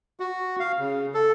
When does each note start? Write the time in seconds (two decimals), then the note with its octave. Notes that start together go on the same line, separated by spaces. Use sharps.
0.20 F#4
0.60 F5
0.79 C#3
1.14 A4